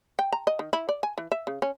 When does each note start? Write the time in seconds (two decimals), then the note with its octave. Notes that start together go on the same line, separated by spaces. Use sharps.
0.19 G5
0.32 A#5
0.47 D#5
0.59 D#3
0.73 E4
0.89 D5
1.03 G#5
1.18 E3
1.32 E5
1.47 C#3
1.62 C#4